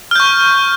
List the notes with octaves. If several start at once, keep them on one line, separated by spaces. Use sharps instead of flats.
C#6 F6 G6